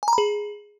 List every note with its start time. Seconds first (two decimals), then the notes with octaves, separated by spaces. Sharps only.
0.03 G#5
0.08 A#5
0.13 B5
0.18 G#4